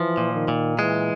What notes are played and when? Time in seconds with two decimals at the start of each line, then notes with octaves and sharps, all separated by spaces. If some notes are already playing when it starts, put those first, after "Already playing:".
Already playing: E3 F3
0.17 A#2
0.33 D#3
0.48 A#2
0.78 E3 G#3